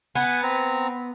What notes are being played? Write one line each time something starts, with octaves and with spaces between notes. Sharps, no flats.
B3 F#5 G#5
C4 A#5